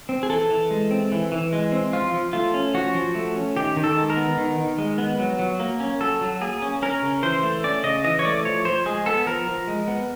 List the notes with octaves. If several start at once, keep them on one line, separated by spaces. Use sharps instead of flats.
C4
G#4
E3 A4
E3
G#3
C4
E3
E3
G#3
C4
F3 F4
F3
A3 F4
C#4
F3 F#4
F3
A3
C#4
D#3 G4
D#3
A4
G#3
A#4
B3
D#3
D#3
G#3
B3
F#3
F#3
A#3
C#4
F#3 A4
F#3
A#3 G#4
C#4
C#4 A#4
C#3
E3 C5
A3
C#4 D5
C#3 D#5
E3 D#5
C#5
A3 D5
F3 C#5
F3 C5
G#3 G#4
B3 A4
F3 A#4
F3
G#3
B3